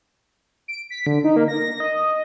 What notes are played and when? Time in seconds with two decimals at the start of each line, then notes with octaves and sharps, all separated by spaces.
0.68 D7
0.90 B6
1.06 D3
1.24 D#4
1.36 A#3
1.48 A#6
1.80 D#5